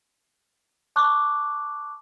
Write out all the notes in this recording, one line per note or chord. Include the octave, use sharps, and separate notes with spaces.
A5 C#6 D6 F#6